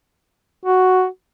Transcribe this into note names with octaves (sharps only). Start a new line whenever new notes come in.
F#4